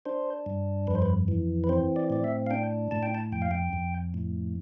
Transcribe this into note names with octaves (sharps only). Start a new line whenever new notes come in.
D4 C5
G2
F2 B4
C5
B4
E3
B4
C4 C5
D5
A2 D5
E5
F5
D4 G5
A2 A5
G5
A5
F2 G5
F5
G5
F2
A2